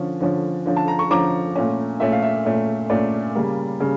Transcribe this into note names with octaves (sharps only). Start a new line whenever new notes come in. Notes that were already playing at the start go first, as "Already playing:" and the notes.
Already playing: D3 F3 C#4
D3 F3 C#4
D3 F3 C#4
A5
A#5
C#6
D3 F3 C#4 A#5 D6
A#2 A3 C#4
A#2 A3 C#4 E5
F5
E5
A#2 A3 C#4
A#2 A3 C#4 D5
C#3 G3 A#3
C#3 G3